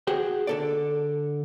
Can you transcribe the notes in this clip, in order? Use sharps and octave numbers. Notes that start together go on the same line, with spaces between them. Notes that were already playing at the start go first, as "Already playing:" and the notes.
F#4 G#4 G5
D3 A4 D5